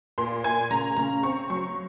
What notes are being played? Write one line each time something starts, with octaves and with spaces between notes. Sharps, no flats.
A#2 C6
A#2 G#5
C#3 A#5
C#3 A#5
C4 C#6
F#3 C#6